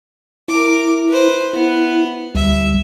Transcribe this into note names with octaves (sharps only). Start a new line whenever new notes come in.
E4 A#4 D6
B4 C5
B3 E4 B4
D2 G3 E5